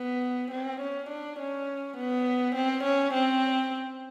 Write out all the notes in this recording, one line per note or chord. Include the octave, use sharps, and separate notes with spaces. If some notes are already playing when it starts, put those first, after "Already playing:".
Already playing: B3
C4
C#4
D4
C#4
B3
C4
C#4
C4